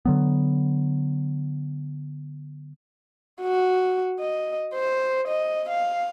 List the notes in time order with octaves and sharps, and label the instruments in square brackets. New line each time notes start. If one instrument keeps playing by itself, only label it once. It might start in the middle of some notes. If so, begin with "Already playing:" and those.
[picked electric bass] D3 F#3 B3
[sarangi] F#4
D#5
C5
D#5
F5